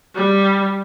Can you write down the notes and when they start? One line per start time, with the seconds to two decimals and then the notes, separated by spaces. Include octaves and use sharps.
0.15 G3